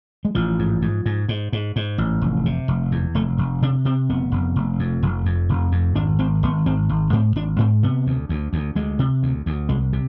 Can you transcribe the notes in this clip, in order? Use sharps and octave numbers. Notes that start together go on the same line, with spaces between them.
G#3
A1 F3
G#2
G#2
G#2
G#2
G#2
G#2
A1
F1
C3
F1
E2
F1 A3
F1
C3 D4
C3 C4
F1 B3
F1
F1
F2
F1
F2
F1
F2
G#1 D4
G#1 C4
G#1 B3
G#1 C4
G#1
G#2 C4
G#1 D4
G#2 C4
C3 B3
D2
D2
D2
D2 G#3
C3
D2
D2
C2 G#3
C3